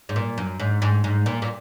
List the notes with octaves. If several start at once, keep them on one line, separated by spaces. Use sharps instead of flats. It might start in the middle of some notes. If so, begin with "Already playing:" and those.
G#2
A#2
F#2
G#2
G#2
G#2
A#2
A#2